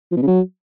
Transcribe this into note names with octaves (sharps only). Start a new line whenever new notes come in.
F3
B2
C#3
F#3